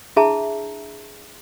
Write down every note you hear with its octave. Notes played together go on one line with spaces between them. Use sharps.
D4 E4 G#4 E5 A5 A#5